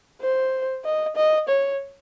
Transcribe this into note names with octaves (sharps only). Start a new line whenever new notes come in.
C5
D#5
D#5
C#5